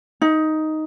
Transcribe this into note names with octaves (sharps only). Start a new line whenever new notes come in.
D#4